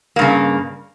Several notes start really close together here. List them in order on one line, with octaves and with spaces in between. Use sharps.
A#3 G2 C#3